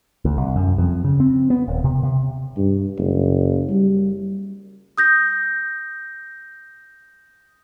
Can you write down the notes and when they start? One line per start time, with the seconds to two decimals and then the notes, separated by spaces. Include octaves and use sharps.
0.25 D2
0.38 C2
0.56 F#2
0.78 F2
1.04 C#3
1.20 C4
1.50 B3
1.68 D#1
1.84 C3
2.03 C3
2.57 G2
2.98 F#1
3.69 G3
4.98 D#6 G6 A#6